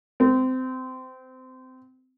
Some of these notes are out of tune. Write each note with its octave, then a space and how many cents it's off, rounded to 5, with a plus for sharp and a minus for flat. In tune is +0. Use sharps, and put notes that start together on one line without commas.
C4 -20